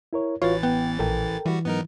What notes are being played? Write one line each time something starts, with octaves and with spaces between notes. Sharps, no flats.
E4 A#4 C#5
A1 E3 F4 F#4 B4 C#5 A6
B3 G5
A#1 A4 A#4 G5
E3 G3 F#4
G#2 F#3 B3 D#4 A#4